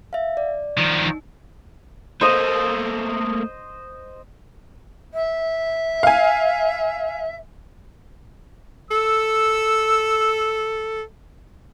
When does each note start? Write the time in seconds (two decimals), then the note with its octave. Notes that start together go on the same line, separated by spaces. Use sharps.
0.13 E5 F5
0.37 D5
0.78 D#3 F3
1.05 D#4
2.21 A3 A#3 C5 D#5
5.13 E5
6.03 F5 G#5
8.91 A4 E6